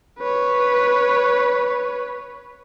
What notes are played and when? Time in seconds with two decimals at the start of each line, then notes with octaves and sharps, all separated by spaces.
0.20 B4 C#5